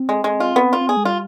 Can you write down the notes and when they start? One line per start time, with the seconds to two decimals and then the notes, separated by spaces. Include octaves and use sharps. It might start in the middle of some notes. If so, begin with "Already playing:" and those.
Already playing: C4
0.09 G#3
0.24 G#3
0.40 F4
0.56 B3
0.73 F4
0.81 C4
0.88 B3 G#4
0.97 G#3
1.05 G3 F4